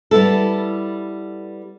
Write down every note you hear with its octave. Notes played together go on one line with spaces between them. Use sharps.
G3 B3 E4 A4